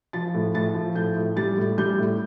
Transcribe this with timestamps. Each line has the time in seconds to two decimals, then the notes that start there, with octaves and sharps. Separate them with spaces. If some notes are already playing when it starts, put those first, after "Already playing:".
0.13 F3 A6
0.34 A2
0.55 A2 A6
0.74 F3
0.95 A2 G6
1.16 A2
1.37 G3 A6
1.58 A2
1.78 G3 G6
1.98 A2